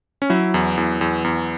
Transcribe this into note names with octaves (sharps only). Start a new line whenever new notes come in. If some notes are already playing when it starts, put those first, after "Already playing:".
C#4
F#3 E4
E2
E2
E2
E2